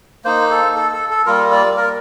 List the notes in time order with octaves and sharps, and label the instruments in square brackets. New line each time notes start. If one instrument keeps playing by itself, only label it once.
[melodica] A#3 D#4 C5
A4
A4
A4
A4
G3 A#3 F4 A#4
D5
A#4